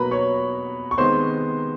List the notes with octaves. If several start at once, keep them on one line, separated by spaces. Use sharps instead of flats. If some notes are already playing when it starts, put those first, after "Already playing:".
Already playing: B2 F#3 A#3 B4 A#5 B5
C#5 C#6
C#6
C3 D#3 G#3 B3 C5 C6